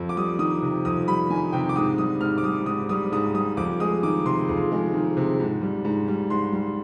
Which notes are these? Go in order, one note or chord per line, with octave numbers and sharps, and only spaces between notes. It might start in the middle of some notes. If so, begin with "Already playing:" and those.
Already playing: F2
D6
G3 D#6
D#3 D#6
C3
F2 D#6
G3 B5
D#3 G#5
C3 G5
D6
G#2 D#6
G3 D#6
G#2 F6
D6
G3 D#6
G#2 D#6
G3 D#6
G#2 D#6
G3 D#6
F2 D6
G#3 D#6
D#3 D6
C3 C6
F2
G#3
D#3
C3
G#2
G3
G#2
G3
G#2 C6
G3